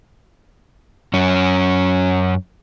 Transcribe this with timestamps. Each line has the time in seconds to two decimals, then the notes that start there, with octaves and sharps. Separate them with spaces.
1.14 F#2 C#4